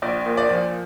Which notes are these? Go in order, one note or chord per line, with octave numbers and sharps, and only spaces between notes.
A#1 D5
A#2
D5
F3